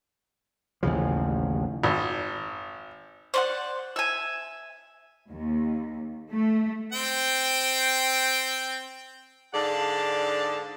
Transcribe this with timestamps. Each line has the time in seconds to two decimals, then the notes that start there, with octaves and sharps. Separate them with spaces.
0.83 A1 D#2 C#3 F3
1.84 G#1
3.34 C5 D5 F#5
3.96 E5 G#5
5.29 D#2
6.30 A3
6.92 C4 G5
9.55 G#2 D3 D4 D5 F5 A5